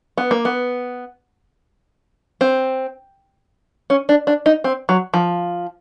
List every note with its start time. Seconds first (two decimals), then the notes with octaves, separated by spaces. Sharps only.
0.18 B3
0.31 A#3
0.45 B3
2.41 C4
3.90 C#4
4.09 D4
4.27 D4
4.46 D#4
4.64 C4
4.89 F#3
5.14 F3